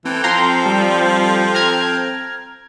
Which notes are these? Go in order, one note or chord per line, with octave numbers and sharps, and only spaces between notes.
E3 C4 A4 G5
F3 F5 A#5 C6
G3
A#5 F6 G#6